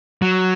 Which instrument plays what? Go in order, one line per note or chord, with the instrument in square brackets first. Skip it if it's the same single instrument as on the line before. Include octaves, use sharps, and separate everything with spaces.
[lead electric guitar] F#3